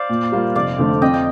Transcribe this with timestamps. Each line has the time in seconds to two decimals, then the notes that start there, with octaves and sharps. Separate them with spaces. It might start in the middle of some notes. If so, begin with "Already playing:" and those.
Already playing: C5 D5 F5
0.09 A#2
0.32 G3 A#3 F4
0.55 F1 D5 F5
0.78 F2 D3 A3 C4
1.02 F2 D#5 G5
1.14 G5